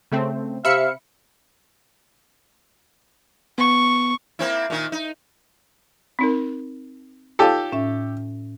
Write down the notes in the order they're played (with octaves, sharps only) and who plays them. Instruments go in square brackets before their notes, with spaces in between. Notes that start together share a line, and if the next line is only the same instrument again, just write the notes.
[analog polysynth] C#3 A3 C4
[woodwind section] C3 F5 [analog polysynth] E5 B5 C#7
[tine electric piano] B3 [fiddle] C#6
[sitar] A#3 C4 E4
A#2 D#3
D#4
[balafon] C4 D#4 A#4
[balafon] D#4 F4 F5 [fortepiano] G4 A4 [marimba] C#5
[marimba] A2 C#4 E5